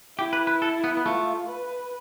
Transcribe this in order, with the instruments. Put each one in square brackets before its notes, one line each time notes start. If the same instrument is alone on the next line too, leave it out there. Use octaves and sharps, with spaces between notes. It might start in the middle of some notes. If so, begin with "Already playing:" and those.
[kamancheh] E4 [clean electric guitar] G4
[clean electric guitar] B4
B4
A4
B3
B3
[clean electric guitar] A3 [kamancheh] F4
[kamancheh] B4